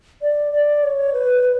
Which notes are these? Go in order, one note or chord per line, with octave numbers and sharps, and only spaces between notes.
D5
D5
C#5
B4